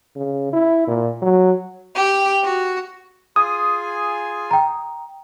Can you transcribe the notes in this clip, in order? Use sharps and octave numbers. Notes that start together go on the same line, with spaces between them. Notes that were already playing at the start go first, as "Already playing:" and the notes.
C#3
E4
A#2
F#3
G4
F#4
F4 G#4 G#5 D#6
G5 A#5